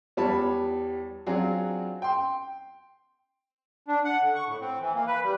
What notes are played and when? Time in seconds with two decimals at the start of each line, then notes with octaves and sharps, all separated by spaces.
0.17 E2 G3 B3 C#5 A5 B5
1.26 F#3 C4 D4 F4 F#4 G#4
2.02 G5 C6
3.88 D4
4.04 F#5
4.21 D3
4.35 C#6
4.46 A2
4.61 C4
4.80 E3
4.94 A#3
5.07 B4
5.23 G3